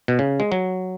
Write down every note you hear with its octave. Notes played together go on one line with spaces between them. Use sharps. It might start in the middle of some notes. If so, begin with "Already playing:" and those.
B2
C#3
G#3
F#3